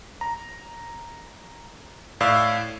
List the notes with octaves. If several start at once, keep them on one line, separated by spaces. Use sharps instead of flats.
A#5
A2 D5 F5 E6